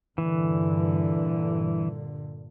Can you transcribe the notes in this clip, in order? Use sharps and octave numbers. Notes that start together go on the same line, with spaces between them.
G2 A#2 D3 E3